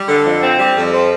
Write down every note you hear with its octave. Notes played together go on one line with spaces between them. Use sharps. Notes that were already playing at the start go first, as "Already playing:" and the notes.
Already playing: G3
D3
F2
C4
G3
F2
F3